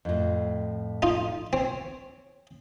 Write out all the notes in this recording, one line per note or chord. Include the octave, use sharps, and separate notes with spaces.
F2 A2
D#4 F4
C4 C#5